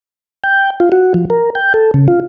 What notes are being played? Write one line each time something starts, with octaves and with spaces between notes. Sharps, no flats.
G5
F4
F#4
F3
A#4
G5
A4
C#3
F4